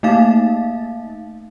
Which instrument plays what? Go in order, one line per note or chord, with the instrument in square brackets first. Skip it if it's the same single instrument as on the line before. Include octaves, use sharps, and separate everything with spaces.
[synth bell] A3 A#3 D#4 F5 A6